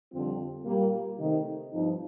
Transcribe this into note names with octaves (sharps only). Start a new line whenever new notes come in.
F2 D3 G3 C4 F4
A#2 G3 A#3
C3 D#3 A3 D#4
G2 F3 C4 D#4